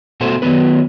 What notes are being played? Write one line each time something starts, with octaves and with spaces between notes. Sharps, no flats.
B2 A3 F#4 A4 C5
D#3 F#3 B3 B4